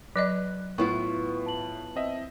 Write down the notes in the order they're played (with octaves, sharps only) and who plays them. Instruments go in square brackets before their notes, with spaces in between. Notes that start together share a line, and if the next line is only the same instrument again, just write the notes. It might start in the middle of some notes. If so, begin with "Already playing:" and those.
[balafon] F#3 D5 D#5 [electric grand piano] B4 [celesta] F#6
[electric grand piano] A2 [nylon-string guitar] B3 E4 F4 [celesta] C#6
[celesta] A5 F#7
[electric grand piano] C4 D#5 E5